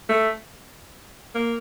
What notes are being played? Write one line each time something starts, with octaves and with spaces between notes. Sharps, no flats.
A3
A#3